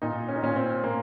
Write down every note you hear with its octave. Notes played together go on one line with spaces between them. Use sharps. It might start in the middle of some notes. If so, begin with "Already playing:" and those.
A#2 D#4
C#4
D#4
A#2 C#4
C4
A#2 A#3